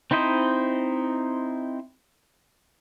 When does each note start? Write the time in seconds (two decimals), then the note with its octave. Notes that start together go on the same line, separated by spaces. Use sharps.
0.11 C4 D#4 E4 C5 D#5